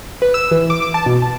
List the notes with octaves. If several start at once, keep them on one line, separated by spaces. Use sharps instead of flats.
B4
E6
E3
D6
D6
A5
B2
A5